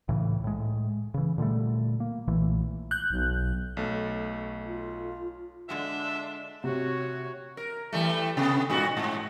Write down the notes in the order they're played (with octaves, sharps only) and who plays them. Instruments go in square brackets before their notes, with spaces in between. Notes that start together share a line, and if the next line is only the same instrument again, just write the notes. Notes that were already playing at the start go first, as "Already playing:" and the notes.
[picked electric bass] C2 A2 C#3 E3
A2 G#3
C#3 E3
A#2 D3 G3 A3
A#3
B1 A#2 E3 A3
[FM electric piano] F#6 G6
[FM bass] B1
[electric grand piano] B1 A3
[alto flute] F4
[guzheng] D3 G#3 F#4 [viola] D4 F4 [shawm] E5
[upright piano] C3 [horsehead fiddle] F#4 C#5
[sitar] A#4
E3 G3 A3
C3 B3
G2 A#2 F#4
G#2